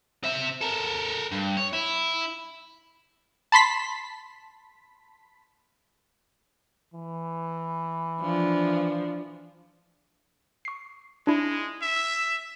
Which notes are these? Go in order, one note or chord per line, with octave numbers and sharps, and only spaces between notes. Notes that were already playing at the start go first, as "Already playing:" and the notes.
C4 E5
A4 A#4
G2
C#5
E4
A5 B5 C6 B6
E3
F3 D4
C#6 C7
G#3 D4 E4
E5